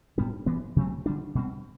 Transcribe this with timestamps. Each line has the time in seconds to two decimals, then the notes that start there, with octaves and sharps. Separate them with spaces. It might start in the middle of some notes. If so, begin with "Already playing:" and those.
0.18 A2 G3 B3 D4
0.46 G2 E3 B3
0.76 C3 F#3 A3 C4
1.06 D3 G3 D4
1.35 B2 G3 C4